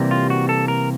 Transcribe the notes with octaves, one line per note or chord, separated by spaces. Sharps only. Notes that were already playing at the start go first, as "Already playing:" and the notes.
Already playing: C3 E3 G3 A#3
F4
F#4
A4
A#4